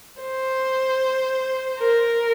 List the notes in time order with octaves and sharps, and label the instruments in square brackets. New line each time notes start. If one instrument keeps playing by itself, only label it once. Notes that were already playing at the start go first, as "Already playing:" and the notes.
[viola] C5
A#4